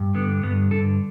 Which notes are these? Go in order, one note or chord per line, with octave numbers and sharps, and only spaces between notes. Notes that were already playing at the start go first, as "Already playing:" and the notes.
Already playing: G2
D3 B3
G2 B3
D3 A4